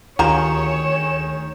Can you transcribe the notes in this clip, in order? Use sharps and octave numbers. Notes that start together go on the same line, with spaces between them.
D2 D#3 F4 G4 G#4 C#5 A#5 E7